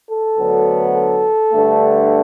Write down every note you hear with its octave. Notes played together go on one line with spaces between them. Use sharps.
A4
D2 D3 F#3 B3
A4
G2 D3 A3